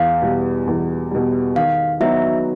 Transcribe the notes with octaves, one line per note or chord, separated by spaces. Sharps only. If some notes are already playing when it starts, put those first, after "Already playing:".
Already playing: E2 F5
B2 G3
E2
B2 G3
D#3 F5
F#3 B3 D#4 F#4 E5